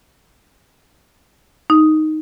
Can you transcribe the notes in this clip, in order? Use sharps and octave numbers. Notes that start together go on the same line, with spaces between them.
D#4